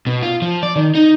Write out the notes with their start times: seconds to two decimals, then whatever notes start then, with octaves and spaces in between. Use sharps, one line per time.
0.07 B2
0.23 F4
0.42 F3
0.63 D5
0.76 D#3
0.95 D#4